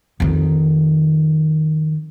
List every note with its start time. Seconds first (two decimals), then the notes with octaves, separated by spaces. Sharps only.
0.20 F2 D#3